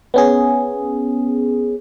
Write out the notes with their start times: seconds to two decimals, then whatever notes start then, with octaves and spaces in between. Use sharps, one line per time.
0.14 B3 C#4 G#4